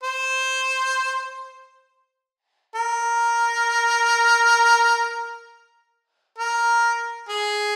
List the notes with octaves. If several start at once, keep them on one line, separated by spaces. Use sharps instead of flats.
C5
A#4
A#4
G#4